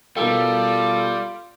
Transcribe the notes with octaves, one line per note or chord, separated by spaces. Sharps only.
B2 G3 F4 A4 A#4 G5